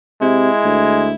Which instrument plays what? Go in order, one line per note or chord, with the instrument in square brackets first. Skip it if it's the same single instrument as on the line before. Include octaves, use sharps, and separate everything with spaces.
[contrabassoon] C3 [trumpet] G#3 [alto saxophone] E4
[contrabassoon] D2